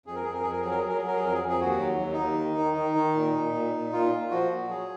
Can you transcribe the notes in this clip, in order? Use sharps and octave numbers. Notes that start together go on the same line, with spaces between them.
F2 G#4
A#4
F2 G#4
A#4
F2 G#4
A#4
F#3 G#4
A#4
G#4
F#3 A#4
G#4
F#3 A#4
G#4
F2 A#4
G#4
F2
G#4
D#2 F#4
F#3
D#2
D#4
D#2
D#3
D#3
D#3
D#3
A#2
A#2
A#2
A#2
A#2 F4
A#2
F3 F#4
A#2
F#3 G#4